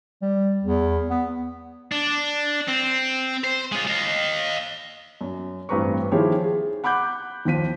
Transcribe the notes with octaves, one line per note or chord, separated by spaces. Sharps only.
G3
E2
B3
D4
C4
C5
G#3 F4
D#5 F5
F#2
A1 G2 C4 B4 A#5 C#6
D#3 F3 E4 G4 G#4 C#5
G#4
F#5 B5 D6 F#6 G6
D#2 D#3 F3 B6 D#7